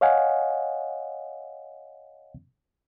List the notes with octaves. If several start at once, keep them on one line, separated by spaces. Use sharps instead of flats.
C#5 D#5 F5 F#5 G#5